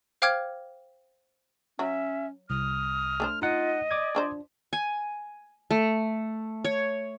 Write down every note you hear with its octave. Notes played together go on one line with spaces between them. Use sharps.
C5 F5 G5 D6 F6 G#6
F#3 C#4 E5
C2 D#6 F6
A3 D4 C5
D#4 F4 D#5 F#5
D5 D6 D#6 G#6
F3 D4 C5
G#5
A3
C#5